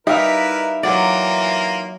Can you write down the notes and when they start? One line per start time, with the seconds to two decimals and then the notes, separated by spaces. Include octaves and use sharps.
0.07 G3 D#4 E4 A#4 B4 E5 F5
0.83 E3 F#3 A#3 F4 D5